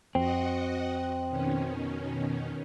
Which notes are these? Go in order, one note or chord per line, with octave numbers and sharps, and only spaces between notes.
F2 C4 F#4 D#5 F#5
B2 D#3 C#4